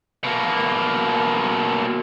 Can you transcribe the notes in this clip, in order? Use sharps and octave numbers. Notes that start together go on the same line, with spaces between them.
B2 A#3